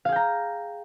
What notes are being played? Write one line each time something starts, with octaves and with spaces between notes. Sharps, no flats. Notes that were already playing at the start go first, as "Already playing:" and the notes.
G#4 F5 G5 A#5